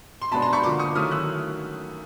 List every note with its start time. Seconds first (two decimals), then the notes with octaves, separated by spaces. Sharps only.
0.22 C6
0.31 B2 G#3 B3 D4 A5 B5
0.42 A#5 C6
0.53 B5 C#6
0.63 D3 F3 A#3 C6 D6
0.79 C#6 D#6
0.95 D#3 F#3 A3 C#4 E4 D#6 F6
1.11 E6 F#6